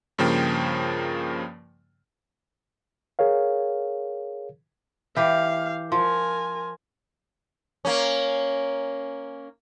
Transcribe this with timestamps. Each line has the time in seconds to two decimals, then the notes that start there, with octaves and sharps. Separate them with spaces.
0.18 G2 C#3 F3 A#3 G5
3.19 G#4 A#4 C#5 F5
5.16 E3 G4 F5 D6 G6
5.92 F3 A#4 G#5 C6
7.85 A#3 C#4